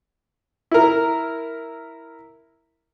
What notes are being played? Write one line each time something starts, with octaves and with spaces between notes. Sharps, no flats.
E4 A#4